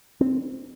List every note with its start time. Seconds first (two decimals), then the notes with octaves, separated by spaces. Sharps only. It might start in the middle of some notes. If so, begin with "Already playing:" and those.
0.21 C4